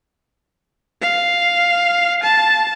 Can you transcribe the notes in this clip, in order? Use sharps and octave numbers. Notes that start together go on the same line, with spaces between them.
F5
A5